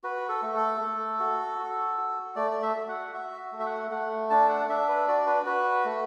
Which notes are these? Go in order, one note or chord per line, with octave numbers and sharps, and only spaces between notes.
F#4 B4
A4
A3
A4
A3
F#4
F#4
F#4
A3 D5
D5
E5
F#4
F#5
F#4 E5
A3
E5
F#5
A3 F#5
D4 A5
F#5
D4 E5
B4
F#4 D5
B4
F#4 B4
A3